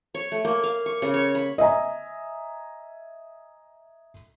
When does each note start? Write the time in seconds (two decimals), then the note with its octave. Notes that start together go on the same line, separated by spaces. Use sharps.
0.14 C#5
0.32 A3
0.45 A#3
0.64 F5
0.86 C#6
1.02 C#3
1.14 C#5
1.35 B5
1.58 D#5 E5 G#5 A#5